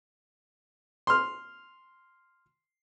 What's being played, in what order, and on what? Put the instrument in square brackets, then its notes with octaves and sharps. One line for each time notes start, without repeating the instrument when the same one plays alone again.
[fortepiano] C6 F6